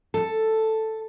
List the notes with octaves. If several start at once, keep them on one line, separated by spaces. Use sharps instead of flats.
A4